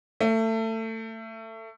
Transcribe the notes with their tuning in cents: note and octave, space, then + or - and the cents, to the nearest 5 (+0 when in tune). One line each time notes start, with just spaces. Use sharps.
A3 +25